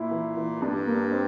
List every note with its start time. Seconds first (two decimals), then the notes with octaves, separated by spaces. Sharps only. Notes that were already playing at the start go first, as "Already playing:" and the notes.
Already playing: A#2 E4
0.11 E3
0.37 E3
0.62 G2 D4
0.87 A#3
1.12 C4